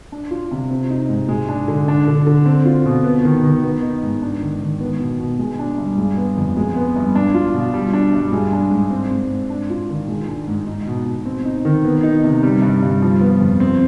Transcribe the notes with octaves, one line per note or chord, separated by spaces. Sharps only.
D4
F4
C3
C4
D#4
G#2
G#3
D4
D3
D4
D3
D3
C4
F4
B2
B3
D#3
D#3
B3
D#4
G#2
D4
D#3
D#3
B3
B2
B2
G#3
D4
G2
G#3
B3
F2
G#3
B3
G2
D4
F4
B2
G3
D4
G2
G#3
D4
G#2
C4
G#2
G#2
D4
F4
D#3
G#3
D4
G#2
D#4
B2
B2
C4
D#4
D#3
B3
D#4
C3
G3
G2
G2
F3
B3
F2
C4